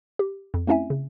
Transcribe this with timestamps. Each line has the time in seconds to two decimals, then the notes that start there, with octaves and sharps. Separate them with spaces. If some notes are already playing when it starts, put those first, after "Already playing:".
0.19 G4
0.54 F2
0.67 A3 C4 C#4 E4 E5 G#5
0.90 C#3